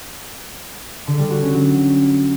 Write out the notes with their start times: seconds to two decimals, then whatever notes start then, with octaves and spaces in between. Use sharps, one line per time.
1.07 D3
1.19 G3
1.31 F#4
1.42 C#4
1.54 F#3